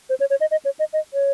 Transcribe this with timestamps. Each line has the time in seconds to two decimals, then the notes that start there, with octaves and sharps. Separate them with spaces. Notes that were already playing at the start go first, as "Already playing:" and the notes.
0.10 C5
0.20 C#5
0.30 C#5
0.41 D#5
0.51 D#5
0.65 C#5
0.79 D#5
0.93 D#5
1.14 C#5